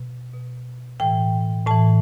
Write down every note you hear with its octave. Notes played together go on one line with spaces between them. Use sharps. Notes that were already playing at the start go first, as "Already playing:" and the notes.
Already playing: B2
B2
A2 E3 G5
A2 E3 A5